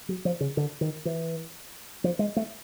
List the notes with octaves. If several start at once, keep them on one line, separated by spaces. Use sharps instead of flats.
F#3
F3
C#3
D3
D#3
E3
F3
G#3
A3